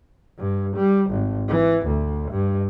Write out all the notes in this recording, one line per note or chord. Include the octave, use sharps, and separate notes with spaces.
G2
G3
G#1
E3
D2
G2